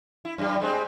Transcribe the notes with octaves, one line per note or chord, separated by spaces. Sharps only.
E4
F#2 G3
G3 G#3 C4